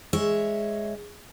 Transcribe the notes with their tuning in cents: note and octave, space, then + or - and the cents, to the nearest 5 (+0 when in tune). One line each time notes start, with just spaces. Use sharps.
G#3 +0 C#5 +0 E5 +0